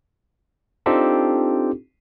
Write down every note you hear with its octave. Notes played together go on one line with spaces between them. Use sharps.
C4 D4 D#4 F4 G4 A4